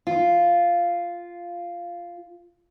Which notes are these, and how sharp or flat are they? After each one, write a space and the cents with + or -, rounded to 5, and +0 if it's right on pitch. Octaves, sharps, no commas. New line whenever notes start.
F4 -5